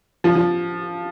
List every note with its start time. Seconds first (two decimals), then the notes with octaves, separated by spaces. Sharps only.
0.24 F3
0.35 F3